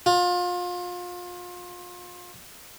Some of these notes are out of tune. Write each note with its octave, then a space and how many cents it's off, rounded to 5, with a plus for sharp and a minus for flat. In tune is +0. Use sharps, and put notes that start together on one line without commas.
F4 +30